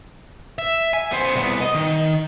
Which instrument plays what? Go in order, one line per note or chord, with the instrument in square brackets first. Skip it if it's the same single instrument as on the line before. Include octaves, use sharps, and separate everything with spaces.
[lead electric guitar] E5
G#5
B3 C5
C2 B3
D#5
D#3